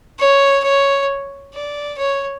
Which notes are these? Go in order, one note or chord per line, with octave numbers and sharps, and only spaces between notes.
C#5
C#5
D5
C#5